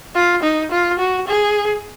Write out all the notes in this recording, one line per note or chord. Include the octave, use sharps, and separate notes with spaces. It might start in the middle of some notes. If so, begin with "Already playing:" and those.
F4
D#4
F4
F#4
G#4